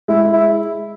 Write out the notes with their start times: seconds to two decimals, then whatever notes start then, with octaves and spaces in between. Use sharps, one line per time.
0.08 G#3 E4
0.25 G#3
0.33 E4